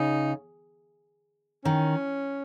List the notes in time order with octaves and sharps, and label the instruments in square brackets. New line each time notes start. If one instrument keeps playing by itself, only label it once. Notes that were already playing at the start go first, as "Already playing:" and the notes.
Already playing: [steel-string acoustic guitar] C#3 [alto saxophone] D#4
[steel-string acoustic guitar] D#3 [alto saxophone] C#4